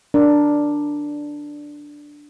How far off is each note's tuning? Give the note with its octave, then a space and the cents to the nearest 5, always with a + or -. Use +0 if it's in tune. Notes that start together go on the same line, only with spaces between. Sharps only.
D4 +0 A#4 +0